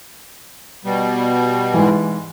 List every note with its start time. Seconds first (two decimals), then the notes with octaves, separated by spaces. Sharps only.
0.85 B2 G3
1.74 G#2 E3